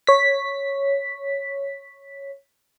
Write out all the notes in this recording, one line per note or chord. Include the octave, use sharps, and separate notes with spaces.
C#5 B6